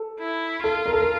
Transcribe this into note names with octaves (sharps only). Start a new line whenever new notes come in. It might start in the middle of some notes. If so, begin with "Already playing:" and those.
Already playing: A4
E4
F4 A4
A#4
A4
A#4